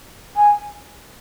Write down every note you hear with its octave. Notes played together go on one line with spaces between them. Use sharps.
G#5